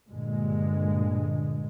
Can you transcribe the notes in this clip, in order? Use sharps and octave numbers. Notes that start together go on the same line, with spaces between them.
G2 A#2 D3 G#3